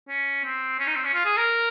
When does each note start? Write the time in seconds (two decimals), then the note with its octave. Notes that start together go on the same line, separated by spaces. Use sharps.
0.09 C#4
0.44 C4
0.79 C#4
0.87 D#4
0.96 C4
1.05 C#4
1.14 F4
1.25 G#4
1.37 A#4